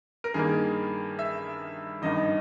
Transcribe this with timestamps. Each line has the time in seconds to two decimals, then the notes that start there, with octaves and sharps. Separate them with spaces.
0.24 A#4
0.34 G2 D#3 A#3 G#4
1.19 E5
2.02 G#1 G2 D#3 D#5